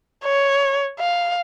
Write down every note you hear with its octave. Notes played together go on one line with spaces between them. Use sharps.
C#5
F5